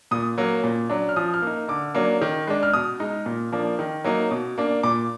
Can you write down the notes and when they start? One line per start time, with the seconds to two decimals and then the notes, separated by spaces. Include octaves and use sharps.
0.11 A#2 D#6
0.38 F#3 A#3
0.64 A#2
0.90 F#3 D4
1.09 F6
1.16 F3 D#6
1.34 F6
1.42 A#3 D#4
1.68 D3 D6
1.95 F#3 A#3 D4
2.22 D#3
2.47 G#3 D4
2.63 F6
2.73 B2 D#6
3.00 G#3 D#4
3.26 A#2
3.52 F3 A#3 D4
3.79 D#3
4.04 F#3 A#3 D#4
4.31 B2
4.58 A#3 D4
4.83 A#2 D6